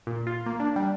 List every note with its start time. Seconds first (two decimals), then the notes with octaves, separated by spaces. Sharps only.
0.07 A#2
0.27 F4
0.46 A#3
0.60 D4
0.76 G3